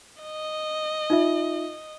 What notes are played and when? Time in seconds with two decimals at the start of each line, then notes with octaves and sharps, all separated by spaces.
0.23 D#5
1.10 D#4 F4 E5